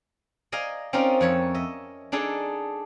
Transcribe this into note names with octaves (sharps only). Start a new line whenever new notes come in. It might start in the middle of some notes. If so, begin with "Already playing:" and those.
D5 D#5 F5 G#5 A#5
C4 C#4 D#4 F4 A#4 D5
F2 C#5 E5
D#5 E5
D4 D#4 G#4 A4 D5